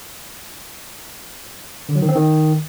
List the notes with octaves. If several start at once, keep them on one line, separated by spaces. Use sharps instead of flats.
D3
F#3
D#3
C4
D#3